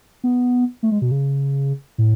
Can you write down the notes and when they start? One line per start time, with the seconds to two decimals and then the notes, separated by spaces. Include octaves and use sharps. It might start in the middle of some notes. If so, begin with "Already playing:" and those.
0.24 B3
0.83 A3
0.92 G#3
1.02 B2
1.11 C#3
1.98 A2